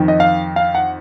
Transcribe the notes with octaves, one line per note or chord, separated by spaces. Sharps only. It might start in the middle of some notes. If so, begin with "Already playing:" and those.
Already playing: F2 D#3
D#5
F5
F5
F#5